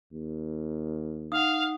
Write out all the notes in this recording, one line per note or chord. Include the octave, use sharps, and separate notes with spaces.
D#2
D#4 F5 F#5 D#6